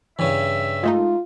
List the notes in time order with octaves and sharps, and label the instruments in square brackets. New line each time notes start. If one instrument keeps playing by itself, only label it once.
[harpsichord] G2 C#3 [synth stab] E3 [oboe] E5
[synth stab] G#3 A3 D#4 [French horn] F4